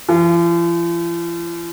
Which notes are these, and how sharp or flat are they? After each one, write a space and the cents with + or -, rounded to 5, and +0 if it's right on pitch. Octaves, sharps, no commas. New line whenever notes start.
F3 -45